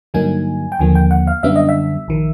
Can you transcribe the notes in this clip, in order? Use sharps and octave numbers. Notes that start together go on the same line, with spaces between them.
G2 D3 F#3 A#3 D#4 G#5
G5
D#2 D3 F3 A#3 G#5
G5
F#5
F5
F#2 D3 G3 B3 D4 E5
D#5
E5
A#1 D#3